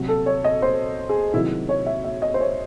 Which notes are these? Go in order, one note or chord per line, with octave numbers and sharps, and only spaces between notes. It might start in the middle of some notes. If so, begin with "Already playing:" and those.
Already playing: C3 F#3
A4
C#5
D#5
C5
G#4
C3 D#3 F#3 E4
C#5
E5
E5
D#5
C5
C#5